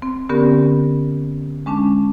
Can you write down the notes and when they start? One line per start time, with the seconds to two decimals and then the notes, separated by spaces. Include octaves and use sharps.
0.02 C4
0.29 D3 B3 C#4 G4 A#4
1.66 G#3 C#4 D4 A5